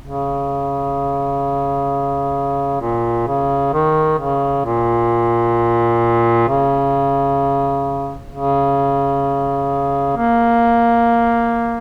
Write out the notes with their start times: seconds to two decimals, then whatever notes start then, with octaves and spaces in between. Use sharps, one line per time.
0.05 C#3
2.81 A#2
3.27 C#3
3.73 D#3
4.19 C#3
4.65 A#2
6.48 C#3
8.32 C#3
10.17 A#3